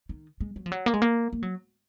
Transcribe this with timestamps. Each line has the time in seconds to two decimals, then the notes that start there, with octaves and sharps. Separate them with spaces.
0.09 D#3
0.41 G#3
0.56 F#3
0.66 F3
0.72 F#3
0.86 A#3
0.94 G#3
1.02 A#3
1.33 A#3
1.43 F#3